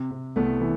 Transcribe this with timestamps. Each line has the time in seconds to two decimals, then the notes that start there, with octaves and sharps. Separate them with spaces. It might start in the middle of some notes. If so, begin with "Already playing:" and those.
Already playing: C3
0.11 C3
0.36 C2 A3 B3
0.61 E3